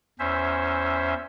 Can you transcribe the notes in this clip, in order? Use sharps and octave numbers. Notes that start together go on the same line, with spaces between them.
E2 C#4 C5 E5